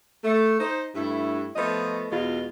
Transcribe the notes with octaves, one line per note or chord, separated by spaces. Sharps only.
A3
D#4 C5
G2 A3 E4
F3 A3 B3 D#5
E2 B2 G#3 F4